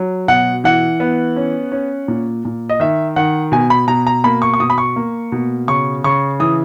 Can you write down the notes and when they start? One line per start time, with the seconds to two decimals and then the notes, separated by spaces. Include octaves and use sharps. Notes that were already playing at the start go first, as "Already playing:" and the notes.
Already playing: F#3
0.28 B2 F#5
0.64 E3 F#5
1.00 B3
1.36 C#4
1.72 C#4
2.08 A#2
2.45 A#2
2.70 D#5
2.80 D#3 E5
3.16 D#3 F#5
3.52 B2 G#5
3.70 B5
3.88 B2 A#5
4.07 A#5
4.24 A#3 B5
4.42 C#6
4.54 C#6
4.60 B2 D#6
4.70 B5
4.78 C#6
4.96 A#3
5.32 B2
5.68 C#3 C#6
6.04 C#3 C#6
6.40 E3 D#6